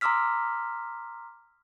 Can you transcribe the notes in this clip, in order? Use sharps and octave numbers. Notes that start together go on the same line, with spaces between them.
A#5 C6 D6 E6 F6 B6